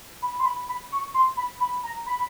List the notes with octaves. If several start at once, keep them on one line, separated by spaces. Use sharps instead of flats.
B5
C6
B5
B5
C#6
C6
B5
B5
A#5
B5